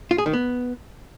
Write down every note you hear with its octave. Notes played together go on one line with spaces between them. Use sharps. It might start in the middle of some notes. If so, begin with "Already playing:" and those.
F4
G#4
D#3
B3